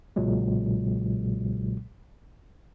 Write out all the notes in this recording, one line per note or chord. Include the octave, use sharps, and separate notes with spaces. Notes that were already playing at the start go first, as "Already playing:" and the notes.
B1 A#2 C#3 F#3 G#3